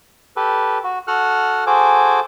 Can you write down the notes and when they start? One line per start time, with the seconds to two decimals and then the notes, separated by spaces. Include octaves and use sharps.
0.36 G4 A4 B4
0.84 F#4
1.07 F#4 A4 F#5 F6 F#6
1.67 F#4 G#4 A4 C5 G#5 D6